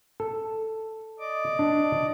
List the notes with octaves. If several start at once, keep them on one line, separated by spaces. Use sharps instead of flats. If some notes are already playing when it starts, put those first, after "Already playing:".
A4
D5 D#5 D6
D4